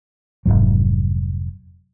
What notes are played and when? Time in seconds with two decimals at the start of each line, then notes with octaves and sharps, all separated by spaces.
0.46 F1 C2 G#2 F#3